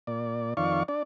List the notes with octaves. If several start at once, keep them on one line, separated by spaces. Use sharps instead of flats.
A#2 D5
F2 D#3 D5 F5 C#6
D4 D5